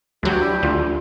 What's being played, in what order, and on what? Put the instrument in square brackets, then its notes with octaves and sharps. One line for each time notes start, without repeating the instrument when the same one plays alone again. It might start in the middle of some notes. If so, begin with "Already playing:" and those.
[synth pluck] D2 F#3 [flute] G4
[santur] G3 D4 E4
[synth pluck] D2 [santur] F4